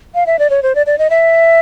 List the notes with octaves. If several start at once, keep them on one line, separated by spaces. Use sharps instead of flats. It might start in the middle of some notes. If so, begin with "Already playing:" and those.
F5
E5
D5
C#5
C5
D5
D5
D#5
E5